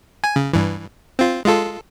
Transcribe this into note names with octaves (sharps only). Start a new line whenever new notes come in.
G#5
C#3
G2 E3
C4 F4
G#3 F4 A4